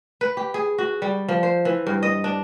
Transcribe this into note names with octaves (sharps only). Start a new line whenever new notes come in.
B4
G4
G#4
F#4
G3
F3
C5
E3
G2
D#5
D4